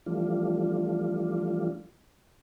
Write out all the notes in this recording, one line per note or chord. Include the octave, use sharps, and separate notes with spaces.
E3 F3 G3 A3 D4 F4